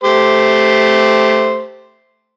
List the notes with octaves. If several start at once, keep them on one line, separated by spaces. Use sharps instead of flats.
A3 G4 C5